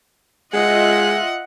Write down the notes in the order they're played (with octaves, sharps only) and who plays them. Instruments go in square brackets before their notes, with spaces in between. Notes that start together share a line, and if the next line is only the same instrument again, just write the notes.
[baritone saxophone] G#3 [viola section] F4 D#5 E5 [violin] F#5